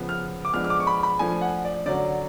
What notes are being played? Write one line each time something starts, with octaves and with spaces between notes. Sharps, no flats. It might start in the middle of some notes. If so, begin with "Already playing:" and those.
Already playing: C#3 F3 B3
F6
D6
F3 G#3 B3 D4 F6
F6
D6
C#6
B5
B5
F3 A3 D4 G#5
F#5
D5
D3 F#3 C#4 D5